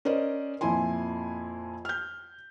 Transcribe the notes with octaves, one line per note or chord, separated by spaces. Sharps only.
C#4 A#4 C5 D5 D#5
F2 A#2 E4 G#5 C6
F6 G6